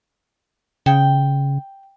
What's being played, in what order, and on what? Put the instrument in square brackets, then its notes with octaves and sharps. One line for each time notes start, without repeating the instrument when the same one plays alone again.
[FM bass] C#3 [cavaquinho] G5